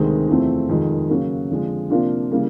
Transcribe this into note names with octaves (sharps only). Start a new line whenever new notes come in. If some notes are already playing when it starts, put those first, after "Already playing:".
Already playing: D2 C3 D#3 G#3 C4
E2 C3 F3 A3 C4
F2 C3 D#3 G#3
C#3 F#3 A#3
F2 D3 F3 G#3
C3 F3 A#3 D4 F4
C#3 E3 G3 A#3